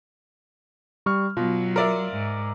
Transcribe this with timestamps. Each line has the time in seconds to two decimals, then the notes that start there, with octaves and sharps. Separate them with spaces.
1.06 G3 C#6 F6
1.37 B2 F#3 F4
1.76 A#4 D5 E5
2.11 G#2